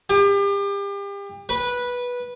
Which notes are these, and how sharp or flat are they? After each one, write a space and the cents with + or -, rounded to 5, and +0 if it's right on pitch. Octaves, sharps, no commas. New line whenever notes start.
G4 +35
B4 -10